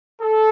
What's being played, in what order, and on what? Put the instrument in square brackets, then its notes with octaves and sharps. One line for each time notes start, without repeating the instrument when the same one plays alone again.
[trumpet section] A4